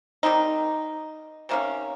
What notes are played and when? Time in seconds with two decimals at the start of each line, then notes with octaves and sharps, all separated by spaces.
0.23 D#3 G3 C4 D#4
1.49 C3 D#3 A#3 C#4